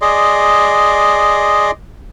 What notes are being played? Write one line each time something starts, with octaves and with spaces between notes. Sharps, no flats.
G#4 D5 D#5 C6